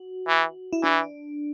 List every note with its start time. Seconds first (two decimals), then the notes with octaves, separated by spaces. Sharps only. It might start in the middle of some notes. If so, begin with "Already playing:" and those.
Already playing: F#4
0.28 E3
0.73 E4
0.83 E3 D4